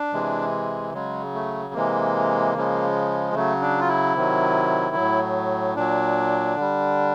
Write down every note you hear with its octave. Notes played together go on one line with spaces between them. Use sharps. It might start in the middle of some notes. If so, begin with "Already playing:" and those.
Already playing: D4
C3 E3 G#3
C#3 F#3 G#3
A3
C3 E3 G#3 A#3
C#3 F3 G#3
C#3 F#3 A3
D4
F4
E4
C3 D#3 F#3
A2 F#3
A#2 F#3 D4
D3 G3